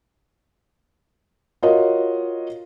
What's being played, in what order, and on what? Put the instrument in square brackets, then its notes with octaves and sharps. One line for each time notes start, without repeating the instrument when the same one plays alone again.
[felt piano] F4 F#4 A#4 C#5 D#5